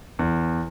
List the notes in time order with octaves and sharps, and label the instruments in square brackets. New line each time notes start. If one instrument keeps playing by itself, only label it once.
[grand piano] E2